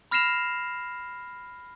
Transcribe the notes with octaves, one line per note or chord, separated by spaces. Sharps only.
B5 F6 A#6 C7 E7 F7